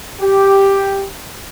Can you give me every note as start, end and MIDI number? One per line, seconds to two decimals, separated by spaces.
0.20 1.04 67